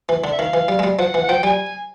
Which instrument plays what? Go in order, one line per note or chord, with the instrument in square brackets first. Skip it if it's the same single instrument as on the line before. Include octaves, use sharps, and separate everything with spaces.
[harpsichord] E3
D3
[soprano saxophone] E5
[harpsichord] D#3 [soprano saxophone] F5
[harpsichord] E3
G3
G#3
G3
[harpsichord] F3 [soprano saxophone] F#5
[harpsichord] E3
[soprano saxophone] F#5
[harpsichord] F3 [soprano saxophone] G5
[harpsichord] G3 [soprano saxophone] G#5